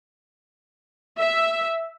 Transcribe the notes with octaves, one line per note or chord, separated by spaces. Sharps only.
E5